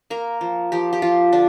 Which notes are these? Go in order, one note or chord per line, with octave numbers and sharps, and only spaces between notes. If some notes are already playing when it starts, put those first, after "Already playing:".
A#3 A#4
F3
F3 G4
G4
F3 F4
D3 D4